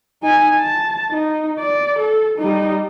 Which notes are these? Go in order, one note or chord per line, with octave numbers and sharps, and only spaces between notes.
D#4 G#5
A5
D#4
D5
A4
G3 D#4